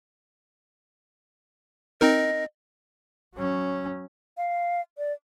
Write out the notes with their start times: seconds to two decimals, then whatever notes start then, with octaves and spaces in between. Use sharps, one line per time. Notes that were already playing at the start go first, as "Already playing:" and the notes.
2.01 C4 D#4 A#4 D#5
3.35 F#3 C#4
4.37 F5
4.98 D5